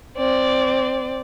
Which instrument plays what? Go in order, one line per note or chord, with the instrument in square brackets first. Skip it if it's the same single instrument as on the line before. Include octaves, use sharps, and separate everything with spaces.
[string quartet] C4 D5